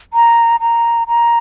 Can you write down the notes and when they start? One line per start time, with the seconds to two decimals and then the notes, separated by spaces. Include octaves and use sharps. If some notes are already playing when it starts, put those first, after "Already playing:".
0.14 A#5
0.61 A#5
1.08 A#5